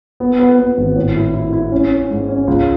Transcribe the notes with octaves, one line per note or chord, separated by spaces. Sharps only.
B3
B3
B3
G#1
A2
E4
E4
E4
C#4
C#4
G#2
C#4
C#2